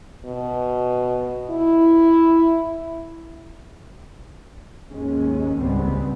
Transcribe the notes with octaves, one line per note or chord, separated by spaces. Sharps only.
B2
E4
D#2 G#2 G#3 C#4
C#2 G#2 G3 G#3 B3 C4